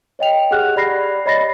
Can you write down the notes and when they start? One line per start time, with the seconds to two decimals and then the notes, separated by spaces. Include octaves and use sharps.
0.19 C#5 D#5 G5 F7
0.51 G4 G#4 F#5 F6 F#6
0.76 G4 D5 B5 A#6 C7
1.26 C#5 D#5 B5 A6 A#6 C7